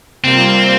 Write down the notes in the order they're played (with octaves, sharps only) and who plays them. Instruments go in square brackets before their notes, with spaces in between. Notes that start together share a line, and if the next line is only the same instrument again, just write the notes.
[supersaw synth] C3 G3 A#3 F4 [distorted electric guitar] C4